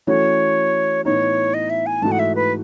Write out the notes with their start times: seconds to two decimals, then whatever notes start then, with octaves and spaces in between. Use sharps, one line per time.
0.07 E3 A3 C#4 F#4 C#5
1.05 A2 E3 B3 D#4 C#5
1.54 D#5
1.70 E5
1.86 G#5
2.02 G#2 E3 A3 D#4 F#4 A5
2.12 F#5
2.19 E5
2.35 B4